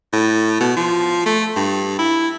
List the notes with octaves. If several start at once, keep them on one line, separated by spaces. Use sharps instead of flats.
A2
B2
F3
A3
G2
E4